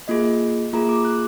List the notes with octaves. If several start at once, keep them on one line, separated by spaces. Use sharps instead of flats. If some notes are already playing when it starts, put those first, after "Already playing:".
A#3 F4 G#4 D#5
A#3 F4 G#4 A#5
D6
F#6